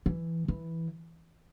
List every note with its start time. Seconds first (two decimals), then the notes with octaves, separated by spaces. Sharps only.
0.06 E3
0.48 E3